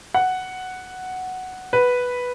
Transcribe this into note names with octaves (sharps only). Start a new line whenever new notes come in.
F#5
B4